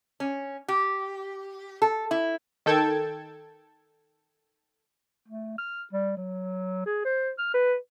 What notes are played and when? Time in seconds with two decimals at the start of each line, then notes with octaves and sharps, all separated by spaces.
0.20 C#4
0.68 G4
1.82 A4
2.11 E4
2.66 D#3 A4 G5 A5 G#6
5.28 A3
5.58 F6
5.93 G3
6.17 F#3
6.86 G#4
7.05 C5
7.39 F6
7.54 B4